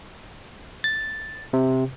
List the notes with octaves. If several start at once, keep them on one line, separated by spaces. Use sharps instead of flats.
A6
C3